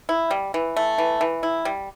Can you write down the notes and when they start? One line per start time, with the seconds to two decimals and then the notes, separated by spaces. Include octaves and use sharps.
0.09 E4
0.31 G3
0.54 E3
0.76 A3
0.98 E3
1.21 E3
1.43 E4
1.65 G3